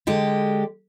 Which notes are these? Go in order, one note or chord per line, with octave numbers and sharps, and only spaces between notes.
D3 G#3 G4